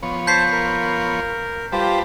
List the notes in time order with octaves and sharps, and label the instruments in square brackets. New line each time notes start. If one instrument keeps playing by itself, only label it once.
[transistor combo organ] F3 B3 C#5
[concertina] C5 A5 [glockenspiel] G6 B6 C7
[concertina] A#4
[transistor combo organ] G3 B4 A5 [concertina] F4 G4 C5